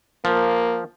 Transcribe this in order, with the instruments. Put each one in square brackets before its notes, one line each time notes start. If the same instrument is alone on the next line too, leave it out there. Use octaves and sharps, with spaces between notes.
[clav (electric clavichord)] F3 [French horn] A#3